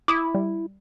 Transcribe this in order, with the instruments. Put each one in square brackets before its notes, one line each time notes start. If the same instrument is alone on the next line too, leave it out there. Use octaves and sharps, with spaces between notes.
[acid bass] E4 [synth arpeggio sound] D6 D#6
[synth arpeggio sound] G3